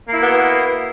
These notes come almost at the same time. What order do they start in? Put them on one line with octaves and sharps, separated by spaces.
A#3 E4 F#4 B3